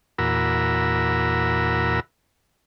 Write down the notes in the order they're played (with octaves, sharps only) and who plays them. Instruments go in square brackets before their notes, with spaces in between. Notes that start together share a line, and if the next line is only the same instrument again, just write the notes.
[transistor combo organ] E2 A#2 F#4 A#4 B5 E6